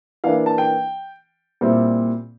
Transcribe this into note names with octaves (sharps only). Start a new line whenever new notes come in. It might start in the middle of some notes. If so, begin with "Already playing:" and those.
E3 A#3 D4 F5
A5
G5
A#2 G3 C4 E4